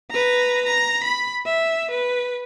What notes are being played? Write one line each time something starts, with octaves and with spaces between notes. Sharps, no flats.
B4 A#5
A#5
B5
E5
B4